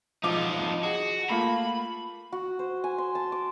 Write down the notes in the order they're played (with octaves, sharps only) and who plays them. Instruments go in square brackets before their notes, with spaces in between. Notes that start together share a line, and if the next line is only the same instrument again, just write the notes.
[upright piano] E1 F3 D6 [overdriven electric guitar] D#4 F4
[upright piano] F2
[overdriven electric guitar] F#4 [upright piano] G#4
[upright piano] A3 A#3 F4 [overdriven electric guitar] B5
[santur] F#4
C5
G#5
C6
A5
D6